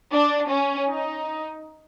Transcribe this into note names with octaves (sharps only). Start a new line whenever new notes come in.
D4
C#4
D#4